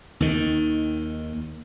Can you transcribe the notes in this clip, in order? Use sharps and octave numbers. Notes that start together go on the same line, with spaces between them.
D#2 D#3